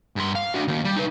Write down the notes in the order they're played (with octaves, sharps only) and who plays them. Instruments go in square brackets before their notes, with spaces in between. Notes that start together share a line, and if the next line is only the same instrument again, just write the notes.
[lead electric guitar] G2 C6
F5
D4 F#4
D#3 A#3
G3
D#4 B4